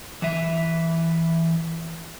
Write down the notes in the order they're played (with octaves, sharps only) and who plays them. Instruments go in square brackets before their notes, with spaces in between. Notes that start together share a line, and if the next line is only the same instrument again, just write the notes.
[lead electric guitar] E3 E5